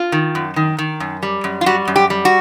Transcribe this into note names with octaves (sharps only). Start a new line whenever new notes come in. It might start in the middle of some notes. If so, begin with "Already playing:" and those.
Already playing: F4
D#3
F#2
D#3
D#3
F#2
G3
F#2
F4
G3 F#4
F#2
G4
G3
F#4